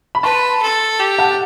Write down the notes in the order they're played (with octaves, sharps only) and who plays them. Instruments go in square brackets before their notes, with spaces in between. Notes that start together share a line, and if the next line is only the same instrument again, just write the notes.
[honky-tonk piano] B5
[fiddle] B4 [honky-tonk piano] A5 C6
[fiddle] A4
G4
[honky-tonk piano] F#5 A5